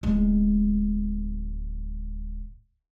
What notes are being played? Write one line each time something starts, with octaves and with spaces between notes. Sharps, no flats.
D1 G#3